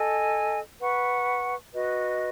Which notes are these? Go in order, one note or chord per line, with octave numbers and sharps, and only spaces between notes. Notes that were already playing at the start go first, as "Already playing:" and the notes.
Already playing: A4 D#5 G#5
B4 F#5 C#6
F#4 B4 D#5